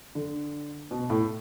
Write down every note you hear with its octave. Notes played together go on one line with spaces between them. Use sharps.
D3
B2
A2